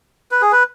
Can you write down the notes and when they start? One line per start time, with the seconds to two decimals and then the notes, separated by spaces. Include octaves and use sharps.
0.31 B4
0.42 G#4
0.52 B4